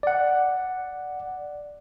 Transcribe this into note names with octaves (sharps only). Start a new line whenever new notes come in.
D5 F#5